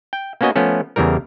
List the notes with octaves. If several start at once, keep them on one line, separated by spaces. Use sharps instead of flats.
G5
A#3 B3 C#4 F#4 D#5
F3 A3 B3 C#4
E2 C#3 E3 G3 A#4